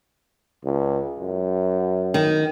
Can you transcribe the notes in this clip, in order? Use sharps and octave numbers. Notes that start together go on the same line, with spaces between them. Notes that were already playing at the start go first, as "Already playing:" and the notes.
C#2
F#2
D#3